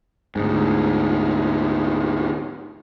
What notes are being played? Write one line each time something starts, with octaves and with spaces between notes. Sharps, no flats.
D2 G#2